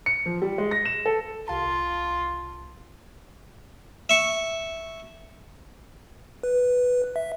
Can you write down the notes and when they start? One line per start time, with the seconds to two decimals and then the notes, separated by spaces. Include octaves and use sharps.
0.06 C#7
0.26 F3
0.42 G3
0.58 G#3
0.71 A#6
0.85 E7
1.06 A4
1.48 C2 F4 F5 A5
4.09 E5 C#6
6.43 B4
7.16 E5